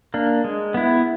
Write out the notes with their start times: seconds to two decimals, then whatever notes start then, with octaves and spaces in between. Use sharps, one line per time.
0.14 A#3 D4
0.44 G#3
0.74 B3 E4